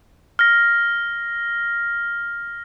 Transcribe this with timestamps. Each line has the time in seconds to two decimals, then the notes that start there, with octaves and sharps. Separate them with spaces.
0.39 F6 A#6